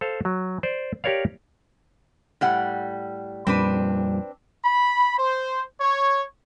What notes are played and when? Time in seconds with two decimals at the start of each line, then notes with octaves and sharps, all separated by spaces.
0.01 A4 C5 F5
0.25 F#3
0.63 C5 D5
1.04 G4 A#4 C#5 D5 F5
2.41 A2 G3 F#5
3.47 F2 A#2 G3 C4 D4 B4
4.63 B5
5.17 C5
5.80 C#5